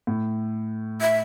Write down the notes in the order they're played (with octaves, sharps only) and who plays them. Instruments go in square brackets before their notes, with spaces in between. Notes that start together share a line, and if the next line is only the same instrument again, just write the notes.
[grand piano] A2
[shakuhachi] E5